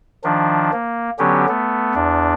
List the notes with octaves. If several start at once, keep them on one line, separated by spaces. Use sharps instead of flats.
D#3 F3 D4
A#3
D3 F#3 B3 C#4 G4
A3 B3
E2 D4